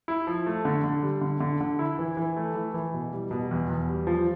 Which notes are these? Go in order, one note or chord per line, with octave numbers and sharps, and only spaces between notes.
E4
F3
A3
D3
D3
G3
D3
D3
D3
E4
E3
E3
A3
E3
E3
B2
G3
B2
E2
E2
G3
F3